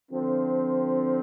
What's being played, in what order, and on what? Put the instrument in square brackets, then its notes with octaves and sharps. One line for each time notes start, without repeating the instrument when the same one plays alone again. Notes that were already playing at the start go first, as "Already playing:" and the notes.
[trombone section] D3 F3 C4